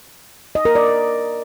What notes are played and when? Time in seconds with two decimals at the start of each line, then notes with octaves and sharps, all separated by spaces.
0.55 D#5
0.65 A#4
0.75 D5